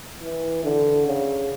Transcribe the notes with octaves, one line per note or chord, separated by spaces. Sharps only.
E3
D3
C#3